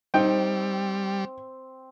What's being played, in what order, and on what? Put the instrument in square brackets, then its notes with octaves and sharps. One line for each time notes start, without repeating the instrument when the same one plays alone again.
[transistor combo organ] G3 [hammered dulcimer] C4 [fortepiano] D#4 G5